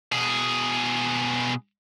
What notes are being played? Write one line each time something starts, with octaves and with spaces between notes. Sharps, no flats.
B2 G#4